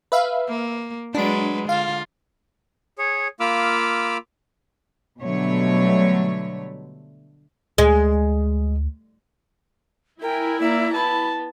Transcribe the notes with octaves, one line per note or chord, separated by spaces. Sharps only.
B4 E5 F5
A#3
F#3 G#3 D4 B4 D7
D3 F4 F5
G#4 C#5
A#3 F4 B5 D6 E6 F6
B2 D3 F#3 G3 A3 C#5
D2 G#3
E4 A#4 G5 G#5
A#3 D5 E5 A#5
B3 A5 B5